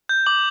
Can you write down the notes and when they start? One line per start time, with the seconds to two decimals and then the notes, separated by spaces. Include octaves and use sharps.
0.09 G6
0.26 D6 F#7